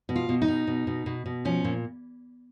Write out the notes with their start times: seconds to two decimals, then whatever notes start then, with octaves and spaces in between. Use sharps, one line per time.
0.09 B2
0.16 F4
0.29 B2
0.42 D#4
0.48 B2
0.67 B2
0.87 B2
1.06 B2
1.26 B2
1.45 F3 C#4
1.64 A#2